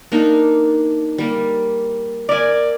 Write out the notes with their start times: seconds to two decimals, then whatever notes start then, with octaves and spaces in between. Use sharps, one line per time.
0.12 A#3 D4 D#4
1.18 G3 A#3
2.29 A#4 D5 E5 G#5